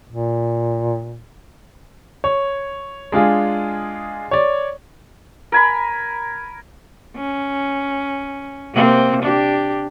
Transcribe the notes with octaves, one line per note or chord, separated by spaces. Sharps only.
A#2
C#5
G#3 D4 F4 G#4
C#5 D5
A#4 G#5 B5
C#4
C3 A#3 C4
D4 G4